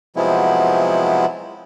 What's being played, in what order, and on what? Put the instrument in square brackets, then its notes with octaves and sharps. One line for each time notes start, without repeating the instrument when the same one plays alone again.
[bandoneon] C3 F3 F#3 G#3 B3 E4